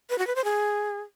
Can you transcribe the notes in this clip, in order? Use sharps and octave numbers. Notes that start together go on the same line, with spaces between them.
B4
F#4
B4
C5
G#4